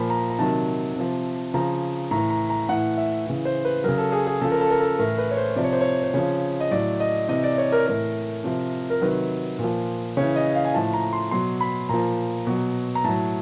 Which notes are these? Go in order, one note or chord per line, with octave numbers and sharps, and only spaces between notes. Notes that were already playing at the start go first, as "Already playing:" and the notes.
Already playing: A#2 F3 B5
A#5
A#5
C3 D#3 F#3 A5
C3 F3
C#3 F3 A#5
A2 E3 A#5
A#5
A#5
A2 E3 F#5
E5
C#3 E3
C5
B4
C#3 F#3 A#4
A4
G#4
G#4
C#3 F3 A4
A#4
A4
A#4
A4
A2 E3 A#4
B4
C#5
C5
C3 F3 D5
C#5
C5
C#5
C5
C#3 F3 C#5
D#5
A2 F#3 D5
D#5
C3 E3 D#5
D5
C#5
A#4
A2 E3 A#4
C3 F3
A#4
C3 D#3 F#3 B4
A#2
F3
C#3 E3 C#5
D#5
F5
G#5
A2 F3 A5
A#5
C6
B2 F#3 C6
B5
A#2 F3 A#5
B2 F#3
A#5
A2 F#3 A5